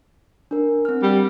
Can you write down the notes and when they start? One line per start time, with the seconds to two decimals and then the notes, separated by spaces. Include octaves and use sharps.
0.51 D4 A#4
0.85 C4 F6
1.03 G3